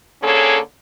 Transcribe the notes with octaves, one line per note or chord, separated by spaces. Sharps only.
D3 A#3 C#4 G#4 A4 C#5